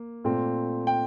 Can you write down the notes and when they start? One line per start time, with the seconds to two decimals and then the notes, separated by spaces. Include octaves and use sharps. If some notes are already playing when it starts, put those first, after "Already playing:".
Already playing: A#3
0.24 A#2 A3 C4
0.87 G5